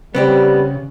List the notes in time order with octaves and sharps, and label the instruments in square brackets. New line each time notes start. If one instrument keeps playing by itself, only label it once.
[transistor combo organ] C#3 [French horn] G3 [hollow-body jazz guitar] B3 C4 G4